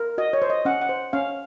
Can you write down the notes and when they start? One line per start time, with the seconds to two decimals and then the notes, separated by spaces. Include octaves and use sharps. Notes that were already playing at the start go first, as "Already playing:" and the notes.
Already playing: A#4
0.18 F#4 D#5
0.33 C#5
0.42 C5
0.50 D#5
0.65 C#4 F#5
0.81 F#5
0.89 C5
1.13 C#4 F5